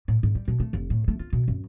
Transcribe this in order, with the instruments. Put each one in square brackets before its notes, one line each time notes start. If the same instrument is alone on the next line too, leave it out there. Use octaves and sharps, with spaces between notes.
[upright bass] A2
G#2
G3
B2
A3
F1
A2
A3
F4
B2
F#2